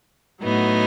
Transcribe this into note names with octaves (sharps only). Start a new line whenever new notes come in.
A2 F#3 B3 D#4